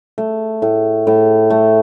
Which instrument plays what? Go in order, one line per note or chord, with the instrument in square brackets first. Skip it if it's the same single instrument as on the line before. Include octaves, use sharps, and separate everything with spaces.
[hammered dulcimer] A3
A2
A2
A3